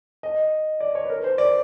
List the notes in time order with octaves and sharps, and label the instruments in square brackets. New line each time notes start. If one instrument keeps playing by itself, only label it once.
[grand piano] D#5
D5
C#5
B4
A#4
C5
D5